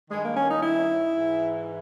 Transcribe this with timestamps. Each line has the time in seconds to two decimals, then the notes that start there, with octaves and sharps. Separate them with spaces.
0.10 G2 D#3 G#3
0.23 A#3
0.36 C#4
0.50 D#4
0.62 E4
1.15 G#2 E3